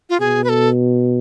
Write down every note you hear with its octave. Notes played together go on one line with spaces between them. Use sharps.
F4
B2 G#4
B4
A4